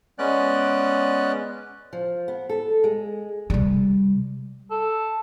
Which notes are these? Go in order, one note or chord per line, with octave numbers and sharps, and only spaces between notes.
G#3 B3 C#4 D5 F#6
F3
B3
A4
G#3
C3 G3
A4